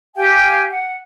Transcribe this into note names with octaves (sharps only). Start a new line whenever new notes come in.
G4 F5 G5 G#5
F#5